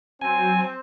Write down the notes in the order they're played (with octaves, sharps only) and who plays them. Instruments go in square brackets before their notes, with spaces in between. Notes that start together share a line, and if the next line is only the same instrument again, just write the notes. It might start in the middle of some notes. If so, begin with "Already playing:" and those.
[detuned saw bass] F#3 [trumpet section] C4 [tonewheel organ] G#5